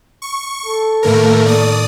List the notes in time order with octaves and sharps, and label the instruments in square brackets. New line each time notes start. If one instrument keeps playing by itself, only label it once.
[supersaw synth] C#6
[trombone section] A4
[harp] A2 D#3 C#5 [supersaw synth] A3 A#3 A#4
[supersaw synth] D5 D#6 [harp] C#6